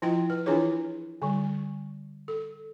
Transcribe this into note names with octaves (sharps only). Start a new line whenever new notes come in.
F3 E4 F4 D#5 G5
B4
E3 D4 E4 F4 G#4 C#5
D3 G3
A4